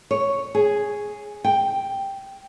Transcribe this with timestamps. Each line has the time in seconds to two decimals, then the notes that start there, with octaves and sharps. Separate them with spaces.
0.11 C#5
0.55 G#4
1.44 G5